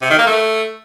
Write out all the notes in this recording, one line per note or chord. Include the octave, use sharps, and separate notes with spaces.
C3
D#3
A#3
A3